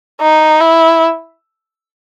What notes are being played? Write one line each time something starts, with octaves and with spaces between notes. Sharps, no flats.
D#4
E4